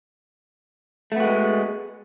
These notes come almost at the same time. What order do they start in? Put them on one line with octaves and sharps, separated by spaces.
A3 B3 F#4 G#3